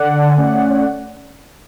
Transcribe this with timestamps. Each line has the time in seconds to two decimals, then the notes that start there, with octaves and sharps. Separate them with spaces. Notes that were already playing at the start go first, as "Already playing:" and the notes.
Already playing: D3 D5 F#5
0.19 A5
0.28 G#5
0.37 A3 C#4 D5 F#5
0.70 C#5
0.77 D5